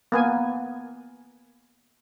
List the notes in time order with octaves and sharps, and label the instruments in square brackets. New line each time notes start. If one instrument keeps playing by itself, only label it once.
[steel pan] A#3 B3 G#5